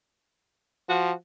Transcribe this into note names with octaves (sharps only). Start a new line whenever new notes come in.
F3 F#4